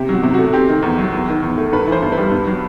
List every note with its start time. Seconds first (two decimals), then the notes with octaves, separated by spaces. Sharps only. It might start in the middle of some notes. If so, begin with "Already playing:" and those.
Already playing: C3 G4
0.09 F#3 F#4
0.23 C3
0.34 A3 F#4
0.53 C4 G4
0.68 D#3
0.82 E2
0.98 F#3
1.12 E2
1.28 D#3
1.43 E2
1.58 A3
1.72 G2 B4
1.87 E3
1.92 C5
2.02 G2
2.12 B4
2.18 G3
2.31 G2
2.47 F#3